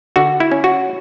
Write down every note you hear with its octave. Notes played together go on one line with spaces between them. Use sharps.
D3 F#4
E4
C#4
F#4